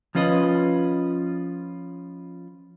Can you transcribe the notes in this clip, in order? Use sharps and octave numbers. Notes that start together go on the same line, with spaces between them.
F3 C#4 F4 B4 D#5